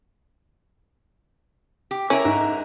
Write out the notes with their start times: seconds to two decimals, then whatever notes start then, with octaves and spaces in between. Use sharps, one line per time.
1.91 G4
2.10 C#4 E4 A#4
2.25 G#2